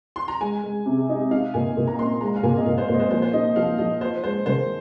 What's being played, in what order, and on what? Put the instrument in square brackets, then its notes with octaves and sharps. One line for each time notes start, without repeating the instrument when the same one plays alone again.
[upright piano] C6
A#5
[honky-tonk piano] G#3 [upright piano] G#5
[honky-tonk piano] G#3
C3
D#4
[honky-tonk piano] D#4 [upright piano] F5
[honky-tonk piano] A#2 [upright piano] G#5
[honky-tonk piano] A#2
[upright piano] A#5
[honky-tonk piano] C4 [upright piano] C6
[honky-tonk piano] G#3 [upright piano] A#5
[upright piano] F5
[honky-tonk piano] A#2 [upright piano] G#5
[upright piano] D#5
[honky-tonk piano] A#2 [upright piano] F5
[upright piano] C5
[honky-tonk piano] A#2 [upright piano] C5
[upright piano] D#5
C5
[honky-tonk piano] F3 [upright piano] C5
[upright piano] C5
[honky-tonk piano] D#4 [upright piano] D#5
[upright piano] D#5
[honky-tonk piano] F3 [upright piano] F5
[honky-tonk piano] F3 [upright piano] D#5
[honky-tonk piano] F4 [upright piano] C5
[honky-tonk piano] G#3 [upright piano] C5
[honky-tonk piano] D#3 [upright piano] C5